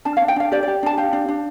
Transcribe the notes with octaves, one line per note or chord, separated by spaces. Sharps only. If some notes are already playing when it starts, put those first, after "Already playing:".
D4 A5
D4 F5
G5
D4 F5
G4 D5
G4 D5
D4 A5
G4 F5
D4
D4